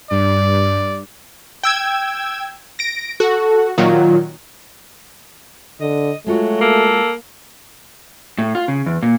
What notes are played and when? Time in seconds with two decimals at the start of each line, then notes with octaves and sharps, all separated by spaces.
0.11 G2 D5
1.64 G5 E6 G#6
2.79 A#6 D7
3.20 F#4 A4
3.78 A#2 D#3 F#3 F4
5.80 D3 D#5
6.26 F#3 G#3 A3 F4 F#4
6.61 A#3 A4
8.38 A2
8.55 F4
8.68 C#3
8.86 E2
9.03 A#2